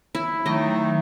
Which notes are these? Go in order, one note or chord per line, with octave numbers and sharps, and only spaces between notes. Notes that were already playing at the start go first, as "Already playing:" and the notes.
E4
D#3 F#3 A3 D#5 G5